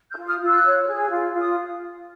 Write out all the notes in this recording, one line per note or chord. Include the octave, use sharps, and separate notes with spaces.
F6 G6
F4
D#6 F6
F4
E6 F#6
C#5
G#4
F4
F4
D#6